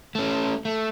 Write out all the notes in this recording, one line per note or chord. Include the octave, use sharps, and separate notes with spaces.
A3 C#4
A3